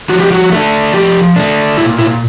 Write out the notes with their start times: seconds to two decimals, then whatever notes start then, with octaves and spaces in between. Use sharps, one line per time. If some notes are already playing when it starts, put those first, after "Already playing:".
0.09 F3 F#4
0.20 G4
0.32 F#4
0.51 A3 D4
0.94 F3 G4
1.36 A3 D4
1.78 A#2 E4
1.98 E4